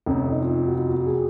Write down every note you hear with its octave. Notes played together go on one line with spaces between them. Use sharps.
F1 F2 C3 C#4
D#4
F4
F#4
F4
F#4
G#4